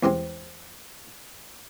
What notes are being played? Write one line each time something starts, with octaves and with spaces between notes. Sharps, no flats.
E2 C3 G#3 C4